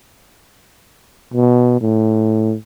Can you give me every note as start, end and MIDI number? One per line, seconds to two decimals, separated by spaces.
1.34 1.78 47
1.81 2.54 45